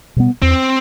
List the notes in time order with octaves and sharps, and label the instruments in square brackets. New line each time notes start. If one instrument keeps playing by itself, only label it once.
[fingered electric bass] B2 G3 B3
[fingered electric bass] E2 [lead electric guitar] C4